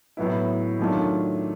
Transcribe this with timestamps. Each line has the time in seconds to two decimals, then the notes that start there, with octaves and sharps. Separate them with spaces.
0.17 A2 F#3 B3 E4
0.79 D#3 F#3 A3 D4 F4